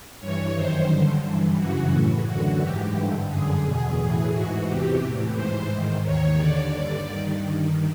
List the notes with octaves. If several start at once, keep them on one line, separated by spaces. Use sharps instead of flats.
G2 E3 C#5
F#2 D#3 C5
G2 D3
G2 E3
F#2 C#3 E3 F#4
A2 E3
F#2 D3 F#4
G#2 E3 G4
G2 D3
F#2 D3 G#4
E2 B2 G#4
A2 E3 G#4
G#2 E3 F#4
E2 C3 E3 G4
A2 E3
G#2 E3 C5
G#2 D#3
D#2 D#3 C#5
D#2 D3 D5
G2 D3 D5
G2 D#3